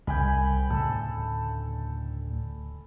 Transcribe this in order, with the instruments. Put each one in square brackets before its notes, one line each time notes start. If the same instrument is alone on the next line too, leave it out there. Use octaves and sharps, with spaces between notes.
[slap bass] C2 C#3 [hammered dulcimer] G5 G#5 B5
[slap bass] D2 A2 C#3 [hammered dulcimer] A4